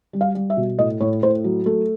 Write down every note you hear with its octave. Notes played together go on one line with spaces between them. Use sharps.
G3
F5
G3
E5
B2
A2 D#5
A2 C#5
A2 C5
F#3
A3